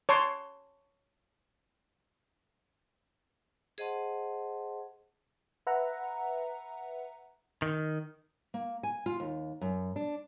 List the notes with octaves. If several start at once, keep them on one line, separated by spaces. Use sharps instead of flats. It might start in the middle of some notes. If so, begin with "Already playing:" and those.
C#5 A5 C6
G#4 C5 D#5 F#5 A5 C6
B4 E5 F#5 A#5
D#3
A#3
G#5
F4
D#2
F#2
D4